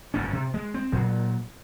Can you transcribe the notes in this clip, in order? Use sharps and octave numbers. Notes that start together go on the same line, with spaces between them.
G1 F#2 A2 C#4
C3
G#3
C4
A#2 F#3